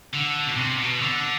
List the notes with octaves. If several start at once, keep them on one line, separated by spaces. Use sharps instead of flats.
D3
B2
C3
B2
D3